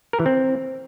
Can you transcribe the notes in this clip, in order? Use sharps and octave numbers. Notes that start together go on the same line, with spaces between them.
A#4
E3
C4